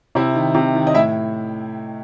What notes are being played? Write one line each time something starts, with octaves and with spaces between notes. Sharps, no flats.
C3 E4 E5
D#3
C3
D#3
D#5
A2 E4 E5